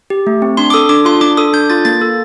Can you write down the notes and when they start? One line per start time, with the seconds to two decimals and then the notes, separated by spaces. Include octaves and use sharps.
0.10 G4
0.27 A3
0.42 C4
0.57 D4 C6
0.70 D6
0.73 A4 D#6
0.89 D4 D6
1.05 F4 C6
1.21 D4 D6
1.37 A4 D#6
1.53 D4 G6
1.70 F4 A6
1.85 A#3 A6
2.01 A4